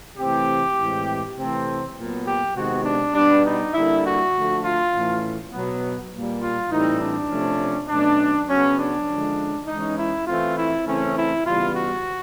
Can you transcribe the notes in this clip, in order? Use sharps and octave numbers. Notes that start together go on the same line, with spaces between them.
C3 E3 A3 C4 G4
A2 E3 G#3 C4
C3 E3 A3 C4
A#2 F#3 B3
G4
C3 D#3 G#3 B3 F#4
D4
B2 G3 B3 D4
D#4
D3 G3 A#3 E4
F#4
D3 F3 A3
F4
A2 E3 A3 C#4
B2 F#3 B3
A#2 G3 A#3
F4
A2 E3 G3 C4 D#4
D4
C3 F3 A3 C#4
B2 F#3 A3 C#4 D4
C#3 F#3 B3 C#4
D4
D3 F3 G#3 C#4
E3 G#3 C#4 D#4
E4
E3 A3 C4 F4
E4
C#3 E3 A3 C4 C#4
E4
C#3 E3 G3 B3 F4
F#4